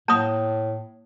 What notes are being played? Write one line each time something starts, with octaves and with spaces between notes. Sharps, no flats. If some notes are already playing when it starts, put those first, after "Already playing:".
A2 A#3 A5 A#5 D#6